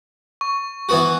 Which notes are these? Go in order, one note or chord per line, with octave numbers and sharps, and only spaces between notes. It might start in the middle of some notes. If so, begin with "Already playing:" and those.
C#6
E3 B3 F#4